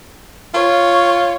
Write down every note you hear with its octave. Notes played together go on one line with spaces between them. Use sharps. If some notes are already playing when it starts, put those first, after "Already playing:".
F4 C#5